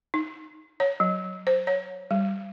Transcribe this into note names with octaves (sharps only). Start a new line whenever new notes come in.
D#4
C#5
F#3
C5
C#5
G3